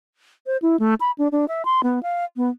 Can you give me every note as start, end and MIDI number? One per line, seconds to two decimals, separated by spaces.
0.47 0.57 72
0.62 0.77 64
0.80 0.94 57
1.01 1.11 83
1.18 1.28 62
1.32 1.45 62
1.48 1.65 76
1.65 1.81 84
1.83 2.02 59
2.03 2.25 77
2.37 2.49 59